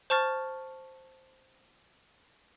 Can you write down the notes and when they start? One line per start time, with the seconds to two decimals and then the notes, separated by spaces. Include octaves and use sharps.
0.10 C5 A5 C#6 F6 A6